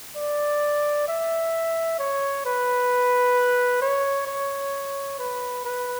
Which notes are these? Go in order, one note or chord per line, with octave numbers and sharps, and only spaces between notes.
D5
E5
C#5
B4
C#5
C#5
B4
B4